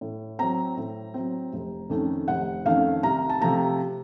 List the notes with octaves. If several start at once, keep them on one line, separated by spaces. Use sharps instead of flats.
A2
F#3 C4 A#5
A2
F#3 C4
F1
F2 D#3 A3 C#4
F1 F#5
F2 D#3 A3 C#4 F5
C2 A#5
A5
C3 F3 A3 A#5